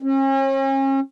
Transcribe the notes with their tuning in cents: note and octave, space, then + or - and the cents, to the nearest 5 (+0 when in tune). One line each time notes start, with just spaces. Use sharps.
C#4 -40